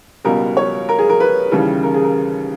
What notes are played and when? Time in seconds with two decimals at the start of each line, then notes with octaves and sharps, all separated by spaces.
0.25 C#2 B2 G3 A#4
0.57 C#5
0.89 A#4
0.99 G#4
1.10 A#4
1.20 B4
1.52 D#2 C#3 E3 G3
1.83 A#4
1.94 G#4
2.04 A#4